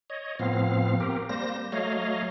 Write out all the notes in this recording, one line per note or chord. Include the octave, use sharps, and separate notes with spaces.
C#5 D#5
A2 F3 B3 C4 F5
C4 G4 A#4
G3 A#3 C5 A#6
F#3 A3 C#5 D#5 F5